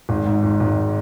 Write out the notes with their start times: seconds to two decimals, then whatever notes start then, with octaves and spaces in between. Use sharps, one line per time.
0.09 G#1
0.26 G#2
0.44 G#1
0.60 G#1